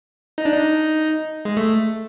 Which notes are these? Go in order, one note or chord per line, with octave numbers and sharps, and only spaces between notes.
D#4
D4
D#4
G#3
A3